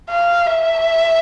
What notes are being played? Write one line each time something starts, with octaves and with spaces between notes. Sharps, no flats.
F5
E5